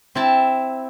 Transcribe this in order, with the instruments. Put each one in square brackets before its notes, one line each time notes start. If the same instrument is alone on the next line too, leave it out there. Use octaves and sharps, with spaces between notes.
[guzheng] C4 E4 A5